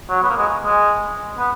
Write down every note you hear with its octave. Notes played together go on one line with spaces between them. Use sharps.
F#3
B3
A#3
G#3
G#3
B3